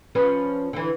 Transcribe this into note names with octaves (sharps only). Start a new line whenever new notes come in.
F3 C#4 B4
D3 E3